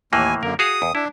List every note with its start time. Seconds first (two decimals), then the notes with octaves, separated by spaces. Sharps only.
0.13 D#2 A2 E3 A#3 G#5
0.43 F#2 D3 A#3 A#4
0.59 F#4 G#4 F5 D#6
0.82 E2
0.95 D4 E4